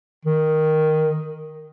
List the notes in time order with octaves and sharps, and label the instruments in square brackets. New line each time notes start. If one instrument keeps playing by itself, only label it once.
[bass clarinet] D#3